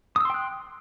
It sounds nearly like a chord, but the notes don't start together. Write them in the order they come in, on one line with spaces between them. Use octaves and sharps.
D#6 E6 C6 G5 F#6